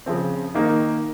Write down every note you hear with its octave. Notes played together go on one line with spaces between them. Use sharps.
C#3 F3 C4
D#3 A#3 D#4